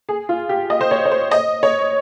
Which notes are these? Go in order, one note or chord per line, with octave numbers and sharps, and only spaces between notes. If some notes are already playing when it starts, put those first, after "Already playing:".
G#4
F4
G4
D#5
C5
C#5
C#5
C5
D#5
C#5